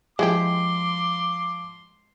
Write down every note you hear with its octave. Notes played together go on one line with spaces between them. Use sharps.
F3 G#3 E4 G4 C6 D6